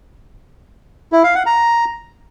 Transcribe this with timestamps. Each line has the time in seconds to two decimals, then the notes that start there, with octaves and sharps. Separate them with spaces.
1.12 E4
1.24 F5
1.35 F#5
1.46 A#5